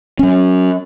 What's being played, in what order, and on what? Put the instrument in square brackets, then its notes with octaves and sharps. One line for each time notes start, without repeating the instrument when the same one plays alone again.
[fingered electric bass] F#3 C#4